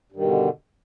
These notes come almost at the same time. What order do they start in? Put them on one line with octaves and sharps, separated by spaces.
G2 D#3 B2 D3